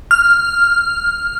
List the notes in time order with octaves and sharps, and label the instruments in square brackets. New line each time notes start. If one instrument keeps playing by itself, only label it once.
[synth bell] F6